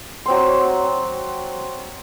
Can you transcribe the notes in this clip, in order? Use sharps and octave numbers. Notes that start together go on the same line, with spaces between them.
F#3 C4 C6